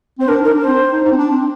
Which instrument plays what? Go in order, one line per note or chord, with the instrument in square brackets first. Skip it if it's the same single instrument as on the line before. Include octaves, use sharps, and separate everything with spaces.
[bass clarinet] C4 [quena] C5
[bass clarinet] D4 [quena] A#4
[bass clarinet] D#4 [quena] A#4
[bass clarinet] D4
[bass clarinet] C4 [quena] C5
[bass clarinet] D#4
D#4
C4
D4
C4